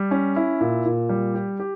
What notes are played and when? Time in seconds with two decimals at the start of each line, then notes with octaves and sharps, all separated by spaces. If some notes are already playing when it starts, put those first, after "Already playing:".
Already playing: G3
0.11 C#4
0.36 E4
0.61 A#2
0.85 A#2
1.09 G3
1.35 G4
1.60 G4